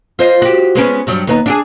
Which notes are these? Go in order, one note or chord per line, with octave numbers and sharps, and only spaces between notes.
F4 C5 D#5
F#4 G4
G#3 B3 C#4
G2 F#3 G3
D#2 B3 D#4
D4 G4 G#4